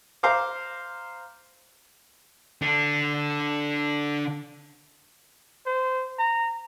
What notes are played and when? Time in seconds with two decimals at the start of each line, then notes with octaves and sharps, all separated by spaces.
0.23 C5 F5 A#5 D6
2.62 D3 D4
5.66 C5
6.19 A#5